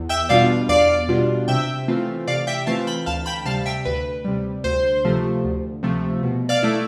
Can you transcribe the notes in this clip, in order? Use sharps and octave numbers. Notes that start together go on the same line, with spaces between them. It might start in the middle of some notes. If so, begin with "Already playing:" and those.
Already playing: E2
E5 G5
B2 G3 D4 F4 D5 F5
E2 D5 F5
B2 G3 D4 F4
C3 E5 G5
E3 A3 C4 F4
C3 D5 F5
E5 G5
E3 A3 C4 F4 F5 A5
G5 B5
D2 F5 A5
G5 B5
C3 G3 F5 A5
E5 G5
D2 B4
C3 G3
D2 C5
C3 F3 A3
D2
C3 F3 A3
B2
D5 F5
A3 E4